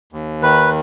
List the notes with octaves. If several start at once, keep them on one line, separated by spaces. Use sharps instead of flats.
D#2
D#3 B4